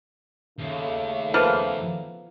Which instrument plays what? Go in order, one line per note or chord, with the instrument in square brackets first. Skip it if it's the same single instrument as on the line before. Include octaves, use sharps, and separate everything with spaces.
[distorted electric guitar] D#2 [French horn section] C#3 A3
[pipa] F3 A#3 B3